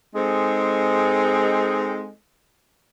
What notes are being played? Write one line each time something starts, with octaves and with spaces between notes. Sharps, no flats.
G#3 C4 D#4 G#4 A4